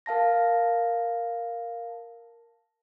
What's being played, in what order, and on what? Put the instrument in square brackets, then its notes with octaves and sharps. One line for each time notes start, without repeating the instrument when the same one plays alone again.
[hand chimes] A#4 F5 A5 A#6